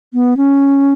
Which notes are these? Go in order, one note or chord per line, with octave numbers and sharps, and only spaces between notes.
B3
C#4